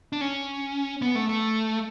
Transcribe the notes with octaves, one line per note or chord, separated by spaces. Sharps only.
D4
C#4
B3
A3
A3